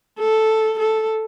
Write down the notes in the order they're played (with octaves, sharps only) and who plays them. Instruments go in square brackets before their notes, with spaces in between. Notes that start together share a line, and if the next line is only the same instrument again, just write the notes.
[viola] A4
A4